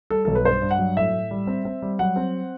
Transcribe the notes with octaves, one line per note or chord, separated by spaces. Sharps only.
G3 A4
B1 A4
B4
G2 C5
G2
F#5
F#3
A2 E5
A2
G3
C4
C4
G3
F#3 F#5
C4